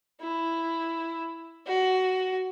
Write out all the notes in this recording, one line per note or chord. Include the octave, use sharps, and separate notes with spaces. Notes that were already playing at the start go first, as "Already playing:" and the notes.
E4
F#4